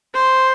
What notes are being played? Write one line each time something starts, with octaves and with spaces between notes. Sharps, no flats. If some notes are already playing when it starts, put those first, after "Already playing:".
C5